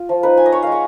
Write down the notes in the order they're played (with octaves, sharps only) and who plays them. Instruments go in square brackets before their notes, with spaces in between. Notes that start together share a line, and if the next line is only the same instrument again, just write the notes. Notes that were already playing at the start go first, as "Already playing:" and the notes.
Already playing: [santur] F4
F3
D#4 B4
D#4 G#5
D#5
F4 C#5
G#3 F5
F#5